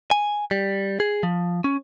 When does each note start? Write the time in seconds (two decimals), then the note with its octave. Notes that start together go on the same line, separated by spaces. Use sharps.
0.11 G#5
0.51 G3
1.00 G#4
1.23 F3
1.64 C#4